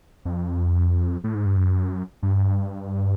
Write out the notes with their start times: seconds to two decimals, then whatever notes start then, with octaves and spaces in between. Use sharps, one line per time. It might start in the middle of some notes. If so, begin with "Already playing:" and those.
0.25 F2
1.24 A2
1.35 G#2
1.46 G2
1.57 F#2
2.23 G2